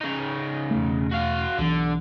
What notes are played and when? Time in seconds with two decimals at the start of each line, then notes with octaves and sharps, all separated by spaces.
0.01 C#3 D#4
0.71 E1 A3
1.12 F#4 F5
1.58 B1 D3 E3